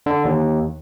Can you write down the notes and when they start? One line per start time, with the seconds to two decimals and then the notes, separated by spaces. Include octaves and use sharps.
0.06 D3
0.25 D#2